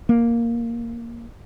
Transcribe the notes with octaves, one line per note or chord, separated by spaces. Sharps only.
A#3